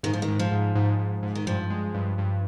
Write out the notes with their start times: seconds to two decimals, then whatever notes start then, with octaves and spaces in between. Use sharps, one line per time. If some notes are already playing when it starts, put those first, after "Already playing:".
0.03 G#2 D#3
0.13 F3
0.22 D#3
0.28 G#2
0.39 F3
0.52 G#2
0.75 G#2
0.99 G#2
1.23 G#2
1.35 D#3
1.46 G2 F3
1.70 G#3
1.94 G2
2.18 G2